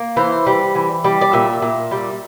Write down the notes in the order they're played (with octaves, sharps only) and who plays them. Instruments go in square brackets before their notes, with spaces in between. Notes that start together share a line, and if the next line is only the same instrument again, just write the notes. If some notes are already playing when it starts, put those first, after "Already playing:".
Already playing: [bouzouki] A#3
E3 C5
G3
E3
G3
D5
A#2 E5
A#2
G3